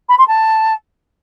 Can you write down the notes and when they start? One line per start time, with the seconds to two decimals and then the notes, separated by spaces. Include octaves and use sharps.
0.09 B5
0.18 C6
0.28 A5